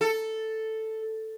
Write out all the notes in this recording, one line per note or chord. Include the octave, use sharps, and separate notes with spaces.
A4